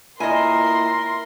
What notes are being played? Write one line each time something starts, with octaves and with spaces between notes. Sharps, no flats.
A#2 E4 A#4 D#5 G#5 C6